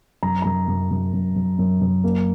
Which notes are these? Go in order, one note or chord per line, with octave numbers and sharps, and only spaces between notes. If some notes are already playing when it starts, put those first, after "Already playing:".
F#2 A#5
F#2 A#5
F#2
F#2
F#2
F#2
F#2
F#2
A#3